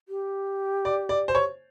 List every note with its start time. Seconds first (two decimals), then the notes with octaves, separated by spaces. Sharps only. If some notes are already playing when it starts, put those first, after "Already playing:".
0.09 G4
0.85 D5
1.09 D5
1.28 C5
1.35 C#5